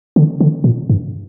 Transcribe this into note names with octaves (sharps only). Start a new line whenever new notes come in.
D3
D3
A#2
G2